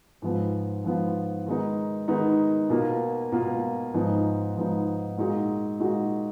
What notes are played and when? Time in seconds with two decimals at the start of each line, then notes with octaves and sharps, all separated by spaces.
0.22 G#2 F3 B3 F4
0.84 G#2 F3 B3 F4
1.46 D#3 G#3 B3 D#4
2.08 D#3 G#3 B3 D#4
2.70 B2 A#3 F4
3.32 B2 A#3 F4
3.94 G#2 F3 B3 D#4
4.56 G#2 F3 B3 D#4
5.18 A#2 G#3 D#4 F#4
5.80 A#2 G#3 D#4 F#4